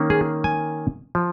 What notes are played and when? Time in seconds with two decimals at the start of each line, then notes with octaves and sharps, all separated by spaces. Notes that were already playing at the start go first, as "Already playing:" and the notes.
Already playing: D#3 A#3 C#4
0.10 G#4
0.44 G#5
1.15 F3